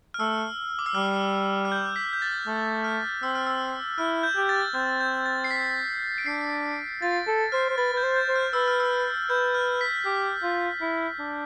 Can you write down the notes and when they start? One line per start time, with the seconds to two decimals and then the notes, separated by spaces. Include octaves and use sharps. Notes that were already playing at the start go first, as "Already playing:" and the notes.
0.14 F6
0.19 A3 E6
0.79 D6
0.86 E6
0.95 G3 F6
1.65 F6
1.72 G6
1.96 B6
2.13 G6
2.22 A6
2.47 A3
2.84 F6
3.23 C4 E6
3.35 F6
3.47 E6
3.98 E4 F6
4.23 G6
4.36 G4
4.49 A6
4.74 C4 G6
5.00 G6
5.26 A6
5.44 C7
5.51 B6
6.18 D7
6.26 D4 C7
7.02 F4 A6
7.27 A4
7.52 C5 F6
7.70 C5
7.78 B4 A6
7.93 B4 G6
8.03 C5
8.16 G6
8.29 C5
8.36 F6
8.53 B4 E6
8.68 F6
8.80 E6
9.30 B4 G6
9.54 F6
9.81 B6
10.06 G4
10.43 F4
10.81 E4
11.20 D4